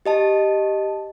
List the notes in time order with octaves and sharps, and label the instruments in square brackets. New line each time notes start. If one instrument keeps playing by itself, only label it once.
[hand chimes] G4 D#5 A5